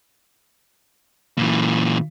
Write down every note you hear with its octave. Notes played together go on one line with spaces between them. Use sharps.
A#2 E3